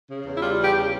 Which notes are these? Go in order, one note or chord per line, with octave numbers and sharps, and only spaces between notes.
C#3
E2
E4
G3 F4
E2
G4
C#3